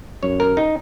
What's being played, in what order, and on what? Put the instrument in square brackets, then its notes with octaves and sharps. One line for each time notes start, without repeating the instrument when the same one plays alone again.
[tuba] F#2 [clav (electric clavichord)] C#5
[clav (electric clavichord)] A#4
D#4